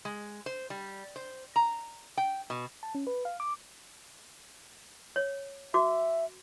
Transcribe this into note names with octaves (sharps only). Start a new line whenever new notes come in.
G#3
C5
G3
C5
A#5
G5
B2
A5
C#4
B4
F5
D6
C#5
F#4 E5 D6